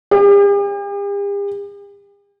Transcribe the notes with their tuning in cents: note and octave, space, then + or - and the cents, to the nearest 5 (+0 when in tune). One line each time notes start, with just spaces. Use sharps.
G4 +45